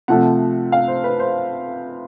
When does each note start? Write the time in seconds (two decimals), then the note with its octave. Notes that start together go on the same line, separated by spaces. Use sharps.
0.08 C3 F3 A3 F#5
0.72 F5
0.88 C5
1.04 B4
1.19 C5